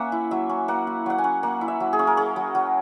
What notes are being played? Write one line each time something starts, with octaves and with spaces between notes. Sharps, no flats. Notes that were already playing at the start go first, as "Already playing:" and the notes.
Already playing: A#3 C#4 E5 F#5 G#5
E4
F#3 E5
C#4
A#3 F#5
E4
F#3 F#5
G#5
C#4
A#3 F#5
E4
E5
F#3
G#4
C#4
A#4
C#4 G#4
F#3
F#3